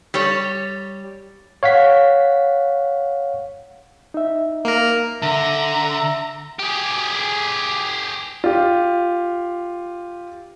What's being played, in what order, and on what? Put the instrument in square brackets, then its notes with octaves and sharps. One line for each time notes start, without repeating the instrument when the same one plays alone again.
[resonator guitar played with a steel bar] G3 C#5
[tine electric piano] C#5 F5 F#5 B6
[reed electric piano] D#4 E5
[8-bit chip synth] A#3 A#4
[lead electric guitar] D3 [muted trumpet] E5 [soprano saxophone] A#5
[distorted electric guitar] G4 G#4
[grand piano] F4 G4